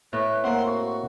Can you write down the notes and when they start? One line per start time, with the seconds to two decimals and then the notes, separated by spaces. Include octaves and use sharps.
0.13 A2 B4
0.44 A#3 C4 F#5 C6
0.66 F#4